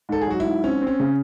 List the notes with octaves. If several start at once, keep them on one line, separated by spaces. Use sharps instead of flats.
G#2 A4
G#4
F#3 F#4
E4
G#2
C4 C#4
C4
C#4
C#3